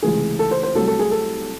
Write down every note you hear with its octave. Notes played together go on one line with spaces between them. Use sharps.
C#2 C3 E3 A3 G#4
A4
C5
C5
C2 C3 F#3 A3 A4
A4
G#4
A4